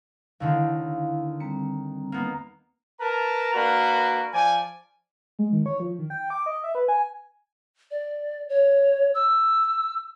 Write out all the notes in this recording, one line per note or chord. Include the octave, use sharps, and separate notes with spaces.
D#2 D3 D#3 E4 F5
G3 C4 A#5 C#7
A#3 B3 D#4
A#4 B4 A5 A#5
A#3 D4 F#4 A#4 B4
F3 D5 G#5
G#3
D#3
C#5
F3
D#3
G5
D6
D#5
E5
B4
G#5
D5
C#5
E6